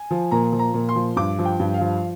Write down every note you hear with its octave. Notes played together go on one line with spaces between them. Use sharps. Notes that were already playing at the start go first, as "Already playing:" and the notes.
Already playing: G#5
F3
A#2 A#5
F3
A#5
A#2
C6
F3
G2 D6
F3
G5
G2
F5
F3